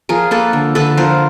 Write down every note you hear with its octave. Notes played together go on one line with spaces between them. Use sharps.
F3 G#4 A#4
A#3 A4 B4
D3
D3 A4 B4
F3 A#4 C5